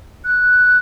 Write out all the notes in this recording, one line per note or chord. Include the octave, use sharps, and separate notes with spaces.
F#6